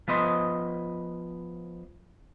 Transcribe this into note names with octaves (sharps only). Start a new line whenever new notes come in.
F3 B3 D#5 C6